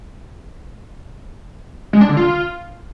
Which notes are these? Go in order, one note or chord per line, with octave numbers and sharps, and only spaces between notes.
G#3
D4
D3
F4